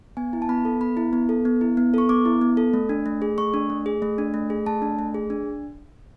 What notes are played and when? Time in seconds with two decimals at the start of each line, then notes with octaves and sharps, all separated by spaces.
0.17 B3 G#5
0.33 E4
0.42 A5
0.49 B3 B5
0.65 A4
0.81 B3 B5
0.97 E4
1.13 B3
1.29 A4
1.45 B3
1.61 E4
1.77 B3
1.94 A4 C#6
2.09 B3 D6
2.25 E4
2.41 B3
2.57 A4
2.73 A3
2.89 D4
3.06 A3
3.22 G#4
3.38 A3 C#6
3.54 D4
3.70 A3
3.86 G#4
4.02 A3
4.18 D4
4.34 A3
4.50 G#4
4.66 A3 A5
4.82 D4
4.99 A3
5.14 G#4
5.30 D4